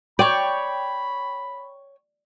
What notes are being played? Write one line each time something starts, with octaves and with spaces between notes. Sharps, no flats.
C#5 D5 G5 B5